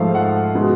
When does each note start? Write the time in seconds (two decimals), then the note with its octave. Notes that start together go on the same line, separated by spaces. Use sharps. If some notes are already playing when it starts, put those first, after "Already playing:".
Already playing: G#2 F3 A3 F5
0.15 F#5
0.55 B2 G#3